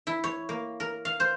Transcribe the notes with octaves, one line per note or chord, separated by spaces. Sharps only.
E4
C#5
A#3
A#4
F5
C5